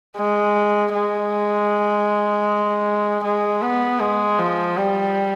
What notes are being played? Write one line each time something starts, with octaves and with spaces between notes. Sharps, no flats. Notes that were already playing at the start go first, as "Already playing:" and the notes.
G#3
G#3
G#3
B3
G#3
F3
G3